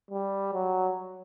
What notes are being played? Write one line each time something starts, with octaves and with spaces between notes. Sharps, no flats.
G3
F#3